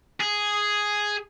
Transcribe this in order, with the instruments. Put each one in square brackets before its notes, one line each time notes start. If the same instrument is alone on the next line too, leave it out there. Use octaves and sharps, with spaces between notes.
[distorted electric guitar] G#4